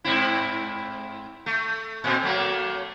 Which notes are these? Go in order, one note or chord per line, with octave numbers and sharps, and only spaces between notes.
G#2 C4 E4
A3
A#2 C4
F#3 A3 A#3